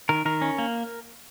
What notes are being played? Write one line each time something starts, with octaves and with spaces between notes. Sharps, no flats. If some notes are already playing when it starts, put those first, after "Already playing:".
D#3 A#4
D#3 A#4
C#4
A#3